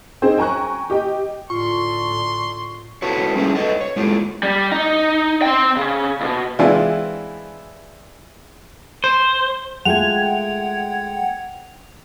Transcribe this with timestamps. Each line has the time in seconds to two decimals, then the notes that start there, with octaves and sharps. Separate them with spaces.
0.22 C4 D#4 G#4 C5 G5
0.37 G5 G#5 A#5 C#6 F#6
0.90 G4 D#5 G5
1.50 A2 D3 F4 C6 C#6
3.02 E4 F#4 A4 B4 C#5
3.35 G3 A3 C#4 E4 G#4 E5
3.54 A4 B4 C#5 D#5
3.81 C#5
3.96 G#3 E4 F4 G4 A4
4.43 G3
4.72 D#4
5.42 C4 G5
5.76 C#3
6.21 C#2 B2
6.59 E3 G#3 C4 D4 E4 F4
9.04 C5
9.85 G#3 A3 F4 F#5 G5 G#6 F7